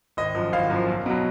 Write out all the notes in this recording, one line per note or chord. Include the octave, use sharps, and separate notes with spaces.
G#1 D#5
F#2 F3
G#1 F5
F#2 F3
B1
B2 F#3